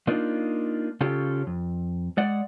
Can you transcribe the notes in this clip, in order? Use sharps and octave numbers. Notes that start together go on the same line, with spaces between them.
A#3 D4 D#4 F4
C#3 C#4 F4 G4 A4
F2
G#3 D5 F#5